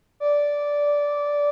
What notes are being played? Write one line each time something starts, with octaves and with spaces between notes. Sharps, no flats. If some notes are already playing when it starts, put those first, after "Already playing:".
D5